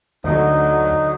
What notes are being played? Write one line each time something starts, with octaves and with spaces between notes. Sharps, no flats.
D2 D3 F#3 D#4